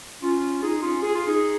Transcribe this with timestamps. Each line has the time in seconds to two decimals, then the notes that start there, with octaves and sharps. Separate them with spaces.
0.22 C#4 F4
0.62 D#4 G#4
0.82 C#4 F4
1.02 G#4
1.15 F4
1.26 D#4 G#4